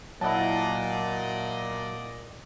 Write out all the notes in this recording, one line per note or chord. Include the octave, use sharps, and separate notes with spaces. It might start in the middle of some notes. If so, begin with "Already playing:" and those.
A#2 F#3 E4 D5 D#5 F#5 A5